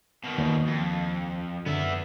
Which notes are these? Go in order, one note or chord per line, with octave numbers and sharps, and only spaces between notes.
B2 D#3
D#2
F2
F#2 D3 B3 E5